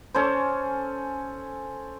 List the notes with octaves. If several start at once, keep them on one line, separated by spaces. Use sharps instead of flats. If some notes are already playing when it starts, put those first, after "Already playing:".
C#4 A4 C5